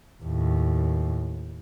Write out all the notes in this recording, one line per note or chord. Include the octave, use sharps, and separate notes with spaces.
D#2 A2